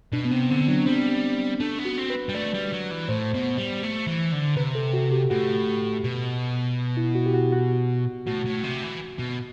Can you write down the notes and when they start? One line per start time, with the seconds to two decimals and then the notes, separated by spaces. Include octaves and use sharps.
0.13 B2 D4
0.25 B3
0.31 C3 C4
0.50 D3 C4
0.68 F#3 D4
0.86 G3 C4
1.60 A3 D4
1.79 B3
1.85 F#4
1.98 C4
2.10 B4
2.29 G3
2.34 A3 D5
2.54 G3
2.72 F#3
2.91 E3
3.09 A2 C5
3.34 B2
3.58 G3
3.83 A3
4.07 E3
4.32 D3
4.56 C3 B4
4.75 A4
4.94 F#4
5.12 G4
5.30 A2 F#4
6.04 B2
6.97 E4
7.15 F#4
7.26 G4
7.34 F#4
7.52 F#4
8.26 A2 F#4
8.45 A2
8.63 C3
8.83 E3
9.19 B2